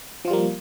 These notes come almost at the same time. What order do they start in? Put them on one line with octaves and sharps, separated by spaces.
F3 F4 G3 A#3